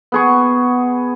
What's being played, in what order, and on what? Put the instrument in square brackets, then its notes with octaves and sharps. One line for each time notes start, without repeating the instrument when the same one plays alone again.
[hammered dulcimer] B3 G#4 C#6